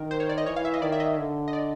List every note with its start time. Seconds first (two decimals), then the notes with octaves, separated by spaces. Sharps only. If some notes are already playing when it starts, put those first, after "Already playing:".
Already playing: D#3 A#4
0.11 C5
0.20 C#5
0.29 D5
0.38 D#5
0.46 E3 C#5
0.56 F5
0.65 E5
0.74 D#5
0.82 D#3 D5
0.92 E5
1.00 D#5
1.18 D3
1.48 D#5
1.53 D5